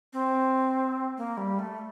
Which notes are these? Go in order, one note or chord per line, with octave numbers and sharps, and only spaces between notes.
C4
A#3
G3
A3